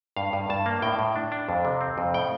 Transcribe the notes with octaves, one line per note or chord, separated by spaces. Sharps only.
G2 F5
G2
G2 A5
A#3
A2 G5
A2
D4
D4
F2
C3
C4
F2
A2 G5